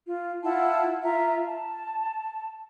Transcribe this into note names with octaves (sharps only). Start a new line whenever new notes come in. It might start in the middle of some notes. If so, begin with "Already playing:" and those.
F4
E4 F4 F#5 A5
F4 E5 A#5
A5